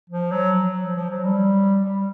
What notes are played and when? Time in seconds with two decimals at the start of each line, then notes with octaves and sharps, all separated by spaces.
0.09 F3
0.31 F#3
0.82 F3
0.96 F3
1.10 F#3
1.24 G3
1.82 G3